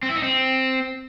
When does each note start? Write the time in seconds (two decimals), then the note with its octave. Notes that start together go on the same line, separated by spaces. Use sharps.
0.03 C4
0.09 E4
0.16 D#4
0.23 C4